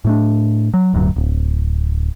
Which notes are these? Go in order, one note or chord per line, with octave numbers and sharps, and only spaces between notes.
A2 A3 D4
F#3
D1 D2 G2 F#3
D1